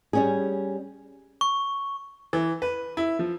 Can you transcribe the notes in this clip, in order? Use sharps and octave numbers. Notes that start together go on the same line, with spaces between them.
G3 C#4 G#4
C#6
E3
B4
E4
F3